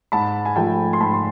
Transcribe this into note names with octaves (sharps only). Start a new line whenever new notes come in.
G#2 A5 B5
G#5
F3 A3 G5 A5
C6
G#2 A5 B5
C6